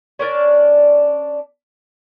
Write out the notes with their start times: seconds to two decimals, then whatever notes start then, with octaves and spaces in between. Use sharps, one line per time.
0.19 C#4 D4 A#4 D5